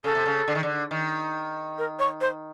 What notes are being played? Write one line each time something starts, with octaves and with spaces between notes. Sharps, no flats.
C#3 A4
C3
C#3
D3
D#3
D3
D#3
A#4
C#5
C5